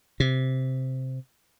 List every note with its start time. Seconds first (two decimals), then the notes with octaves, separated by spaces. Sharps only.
0.20 C3